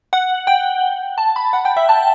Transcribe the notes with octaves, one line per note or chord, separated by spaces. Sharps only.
F#5
G5
A5
B5
F#5
G5
E5
A5